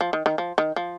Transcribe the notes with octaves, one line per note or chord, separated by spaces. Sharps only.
F3
D#3
D#3
F3
D#3
F3